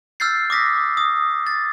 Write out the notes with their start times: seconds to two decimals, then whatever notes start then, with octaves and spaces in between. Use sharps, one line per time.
0.20 E6 F6 G6 A6 C7
0.50 D6 D#6 A#6 B6
0.97 D#6
1.46 A6